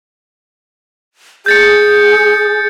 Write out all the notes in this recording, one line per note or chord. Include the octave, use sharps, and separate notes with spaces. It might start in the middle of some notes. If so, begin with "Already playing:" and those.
G#4 G6 A6 C#7